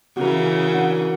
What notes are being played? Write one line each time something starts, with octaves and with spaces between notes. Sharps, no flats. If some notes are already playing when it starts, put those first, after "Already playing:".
C#3 E3 F#4 A#4
D4 F#5